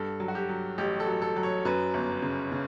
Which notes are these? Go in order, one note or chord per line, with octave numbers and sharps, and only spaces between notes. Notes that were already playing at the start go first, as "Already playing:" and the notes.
Already playing: G2 A4
F#3
F#4
G4
F#3
A1 G4
A4
F#3
A4
F#3
C#5
F#2 B4
G1
C#3
C#3